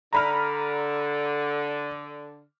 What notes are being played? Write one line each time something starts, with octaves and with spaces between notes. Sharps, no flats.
D3 A#5 B5 F6